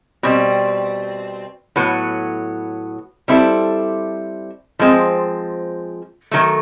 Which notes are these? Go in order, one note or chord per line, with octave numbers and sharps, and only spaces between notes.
B2 G3 C4
A2 F#3 B3
G3 C4 E4 A4
F3 G#3 C4
D#3 F#3 A3